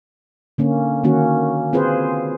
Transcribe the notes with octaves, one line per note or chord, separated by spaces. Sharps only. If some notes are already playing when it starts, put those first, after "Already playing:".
D3 A#3 C#4
D#3 A#3 C#4 F#4
C4 F4 G#4 B4 C5